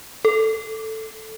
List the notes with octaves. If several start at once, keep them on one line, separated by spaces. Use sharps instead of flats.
A4